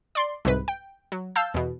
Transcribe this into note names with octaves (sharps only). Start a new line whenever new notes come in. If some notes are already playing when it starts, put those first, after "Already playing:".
D5 C6
C2 G#2 C3 B4
G5
F#3
F5 A5 E6 G6
E2 B2